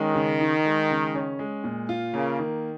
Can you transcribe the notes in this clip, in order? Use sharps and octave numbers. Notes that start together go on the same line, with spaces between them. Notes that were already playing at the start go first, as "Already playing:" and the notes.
Already playing: D#3 G#3 C#4
C#3
D#4
G#3
C#3
C#4
G#3
A#2
F4
C#3 A#3
D#3